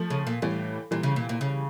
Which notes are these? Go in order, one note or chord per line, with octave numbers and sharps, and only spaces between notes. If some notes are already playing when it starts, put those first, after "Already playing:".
Already playing: F3 A3
C#3
A#2
A2 E3 G3
A#2 E3 G3
C#3
A#2
A#2
C#3